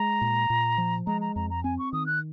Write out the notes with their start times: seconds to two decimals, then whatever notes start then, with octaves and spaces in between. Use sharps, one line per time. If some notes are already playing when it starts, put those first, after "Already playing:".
Already playing: G#3 A#5
0.21 A#2
0.50 A#2
0.78 F3
1.07 G#3 A#5
1.21 A#5
1.36 F2 A#5
1.50 A#5
1.64 C4 G#5
1.79 C#6
1.93 D#3 D#6
2.06 F#6